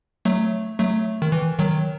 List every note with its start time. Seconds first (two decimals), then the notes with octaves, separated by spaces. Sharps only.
0.25 F#3 A3
0.79 F#3 A3
1.22 D#3
1.32 E3
1.59 D#3 F#3